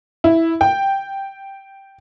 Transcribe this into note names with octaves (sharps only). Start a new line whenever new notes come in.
E4
G5